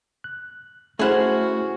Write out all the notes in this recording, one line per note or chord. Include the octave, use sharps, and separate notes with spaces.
F#6
A3 C#4 E4 F#4 G#4 C5 F#5 F6